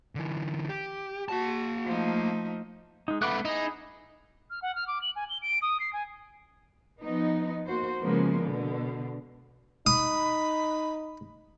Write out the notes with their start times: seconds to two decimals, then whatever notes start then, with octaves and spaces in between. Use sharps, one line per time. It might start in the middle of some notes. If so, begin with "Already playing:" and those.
0.15 D3 E3
0.69 G4
1.29 A#3 F#4 A5
1.85 F3 A3 D#4
3.08 G#3 D#4
3.22 A3 B3 B5 D6 F#6
3.45 D#4 E4 G#4
4.50 F6
4.62 F#5
4.75 F6
4.88 D6
5.02 F#7
5.16 G#5
5.29 G7
5.42 D7
5.62 D#6
5.80 C7
5.93 G#5
7.01 F3 B3 D#4
7.67 A#3 F#4 C5
8.02 C#3 F3 G#3 A#3 B3
8.43 B2 D3
9.87 D#4 B5 D#6